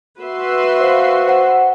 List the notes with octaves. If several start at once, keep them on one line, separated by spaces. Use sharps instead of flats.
F#4 B4 E5 C6
C5 F5
C5 F#5